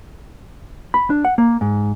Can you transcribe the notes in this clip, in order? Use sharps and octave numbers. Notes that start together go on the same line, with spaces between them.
B5
D4
F#5
A#3
G#2